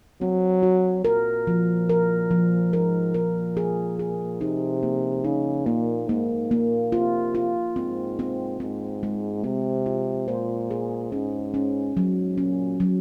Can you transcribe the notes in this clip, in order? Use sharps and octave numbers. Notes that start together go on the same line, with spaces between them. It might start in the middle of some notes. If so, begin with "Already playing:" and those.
F#3 C4
F#4
A#2 A#4
F3
A#4
F3
G#2 A#4
A#2 A#4
G#4
G#4
C3 D#4
A#3
C#3 D#4
A#2 A#3
G#2 A#3
A#2 A#3
C3 F4
F4
G#2 C4
C4
G#2 C4
G#3
C3 C4
F4
A#2 C5
G#4
G#2 C#4
C#4
G#2 F#3
A#2 C#4
F#3